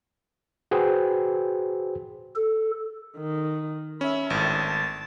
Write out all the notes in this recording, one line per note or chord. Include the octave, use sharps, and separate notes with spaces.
F#4 G#4 B4 C5 G5
A4
D#3
C#4 E5 B5
G#1 A2 A5